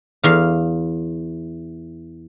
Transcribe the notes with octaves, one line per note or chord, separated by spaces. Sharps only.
E2 F5